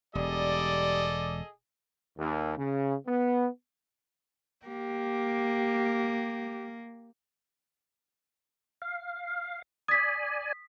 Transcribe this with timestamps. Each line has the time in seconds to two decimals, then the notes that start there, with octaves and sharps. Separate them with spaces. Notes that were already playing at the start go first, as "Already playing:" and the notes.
0.15 E1 G3 G#4 A4 D5 D#5
2.18 D#2
2.57 C#3
3.07 B3
4.67 A#3 G4
8.82 F5
9.88 D5 G#5 D#6 B6